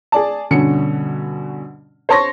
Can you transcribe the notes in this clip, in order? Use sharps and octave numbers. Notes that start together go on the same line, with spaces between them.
G#4 D5 A5
G2 B2 D3 C#4 C#7
C5 C#5 A5 C6 C#6 A#6